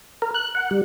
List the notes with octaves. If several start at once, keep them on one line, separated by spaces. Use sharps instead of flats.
A#4
F#6
F#5
G3